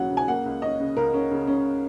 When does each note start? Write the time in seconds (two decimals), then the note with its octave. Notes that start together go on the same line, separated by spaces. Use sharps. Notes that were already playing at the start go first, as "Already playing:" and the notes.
Already playing: D#2 C#3 F#3 C#4 F#5
0.11 C#3
0.17 G#5
0.28 A#3 F#5
0.46 C#2
0.62 C#4 D#5
0.80 C#3
0.97 C#2 A#4
1.14 C#4
1.31 C#3
1.47 C#4